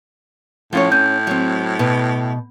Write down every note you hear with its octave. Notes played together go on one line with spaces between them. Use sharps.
A2 F3 C#4 C#5
C#4 G6
F#3 C4
B2